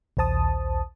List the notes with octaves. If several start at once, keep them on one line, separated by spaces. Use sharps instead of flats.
A#1 D#2 C5 A5 D#6